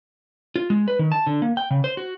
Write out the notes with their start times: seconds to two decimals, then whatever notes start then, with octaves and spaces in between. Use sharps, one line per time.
0.56 F4
0.70 G#3
0.88 B4
0.99 D#3
1.12 A5
1.27 D3
1.42 A#3
1.57 G5
1.71 C#3
1.84 C5
1.97 F#4